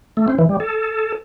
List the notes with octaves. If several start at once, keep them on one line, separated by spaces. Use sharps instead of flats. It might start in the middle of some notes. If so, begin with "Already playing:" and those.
A3
C4
E3
G3
A4